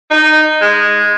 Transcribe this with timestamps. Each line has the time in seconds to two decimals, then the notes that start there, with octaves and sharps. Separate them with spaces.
0.11 D#4
0.61 G#3